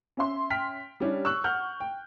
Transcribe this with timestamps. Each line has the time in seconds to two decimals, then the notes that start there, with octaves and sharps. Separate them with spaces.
0.17 C#4 E5 C6
0.50 G5 F6 B6
1.00 G3 C#4 D4 E4 G4
1.25 C#6 E6 F#6
1.44 F#5 F6 G6
1.80 G5